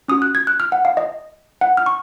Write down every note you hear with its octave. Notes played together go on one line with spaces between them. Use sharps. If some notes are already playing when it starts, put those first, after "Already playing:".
C#4 F#4 D#6
F#6
G#6
F#6
F6
F#5
F5
D#5
F#5
F6
C#6